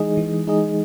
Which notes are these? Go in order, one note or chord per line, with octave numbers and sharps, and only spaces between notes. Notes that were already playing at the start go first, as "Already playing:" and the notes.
Already playing: E3 G#3 D#4 G#4 D#5
E3
G#3 D#4 G#4 D#5